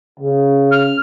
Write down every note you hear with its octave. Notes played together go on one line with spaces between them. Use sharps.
C#3
F6